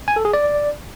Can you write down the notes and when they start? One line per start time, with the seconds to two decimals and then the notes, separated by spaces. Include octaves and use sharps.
0.08 G#5
0.16 A4
0.25 G#4
0.33 D5